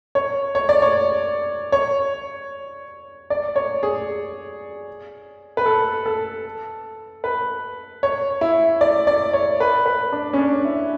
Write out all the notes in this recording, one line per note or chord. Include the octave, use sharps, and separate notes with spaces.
C#5
C#5
D5
C#5
C#5
D5
C#5
G#4
B4
A4
A4
B4
C#5
E4
D5
D5
C#5
B4
B4
D4
C#4
D4
E4